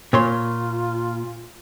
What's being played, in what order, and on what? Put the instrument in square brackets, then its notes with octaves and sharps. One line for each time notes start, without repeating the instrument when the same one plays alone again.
[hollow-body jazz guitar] A#2 C#5 C6 [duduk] F4